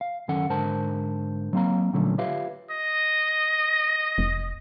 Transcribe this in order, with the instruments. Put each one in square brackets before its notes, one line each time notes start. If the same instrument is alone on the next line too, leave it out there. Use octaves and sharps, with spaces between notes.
[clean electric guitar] F5
F#2 D#3 C#4 A4 F#5
G#2 D3 A#4 C5 A5
F#3 A#3 C4 C5 F5 A#5
A#2 D3 F3 F#3 A3 C#4
F4 G4 B4 C#5 E5 F5
[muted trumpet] D#5
[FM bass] F1